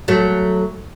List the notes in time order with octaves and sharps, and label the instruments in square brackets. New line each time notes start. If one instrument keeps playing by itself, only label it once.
[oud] F#3 A3